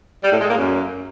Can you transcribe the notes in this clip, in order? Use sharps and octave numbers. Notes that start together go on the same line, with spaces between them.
G3
A2
G#3
A#3
F#2